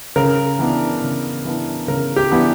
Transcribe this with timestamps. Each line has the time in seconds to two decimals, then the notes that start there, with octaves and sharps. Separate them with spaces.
0.16 C#3 A#4
0.59 E3 B3 D4
1.02 C#3
1.45 E3 B3 D4
1.88 C#3 A#4
2.16 G4
2.31 E3 B3 D4